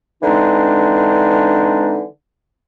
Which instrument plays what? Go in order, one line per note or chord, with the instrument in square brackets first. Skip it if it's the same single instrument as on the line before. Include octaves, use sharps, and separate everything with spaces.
[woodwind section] D3 E3 G#3 C4 D4 D#4